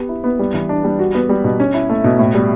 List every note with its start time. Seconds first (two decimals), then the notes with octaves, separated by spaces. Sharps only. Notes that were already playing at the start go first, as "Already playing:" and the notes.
Already playing: B3 G4
0.09 E4
0.24 B3
0.39 G3
0.54 E3
0.69 D4
0.84 G3
0.99 F#4
1.15 B3
1.29 G3
1.44 B2
1.60 C#4
1.74 E4
1.90 A3
2.04 B2
2.19 A2
2.34 G3